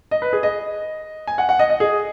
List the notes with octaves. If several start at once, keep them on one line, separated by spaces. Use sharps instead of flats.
D#5
B4
G#4
D#5
G#5
F#5
F#5
D#5
D#5
G#4